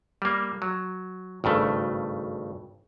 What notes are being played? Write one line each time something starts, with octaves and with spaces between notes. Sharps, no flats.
G3 A#3
F#3
G#1 G2 C#3 A3